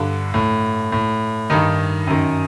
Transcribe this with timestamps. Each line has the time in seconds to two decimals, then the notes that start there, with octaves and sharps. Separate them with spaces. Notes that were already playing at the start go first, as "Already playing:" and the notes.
Already playing: G2 D3
0.34 A2
0.92 A2
1.50 G2 D#3 D#4
2.07 F#2 D#3